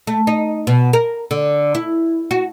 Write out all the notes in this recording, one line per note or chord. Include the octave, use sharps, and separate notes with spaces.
A3
D#4
B2
A#4
D3
E4
F#4